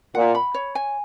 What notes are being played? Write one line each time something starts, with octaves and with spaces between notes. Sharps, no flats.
A#2 F#5
B5
C#5
G#5